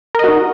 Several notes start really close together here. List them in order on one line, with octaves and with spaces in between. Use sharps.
A#4 D#5 F#4 D#4